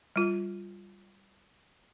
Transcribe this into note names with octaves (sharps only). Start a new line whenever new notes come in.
G3 F4